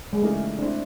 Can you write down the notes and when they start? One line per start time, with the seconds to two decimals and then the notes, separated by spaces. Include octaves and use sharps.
0.13 G#3
0.22 C#3 E3 G3 A3 A#3 D#4
0.59 A3 C4 D4 E4